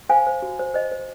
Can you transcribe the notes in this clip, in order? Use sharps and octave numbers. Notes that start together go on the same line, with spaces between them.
C5 F5 G#5
C5
F#4
C5
C5 D#5
C5